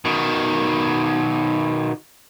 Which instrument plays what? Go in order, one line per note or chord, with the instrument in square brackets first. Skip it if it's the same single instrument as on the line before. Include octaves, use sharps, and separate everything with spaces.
[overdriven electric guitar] B2 D#3